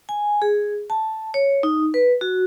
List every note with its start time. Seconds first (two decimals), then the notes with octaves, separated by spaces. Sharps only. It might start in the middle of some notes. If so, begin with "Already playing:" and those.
0.09 G#5
0.42 G#4
0.90 A5
1.34 C#5
1.63 D#4
1.94 B4
2.21 F#4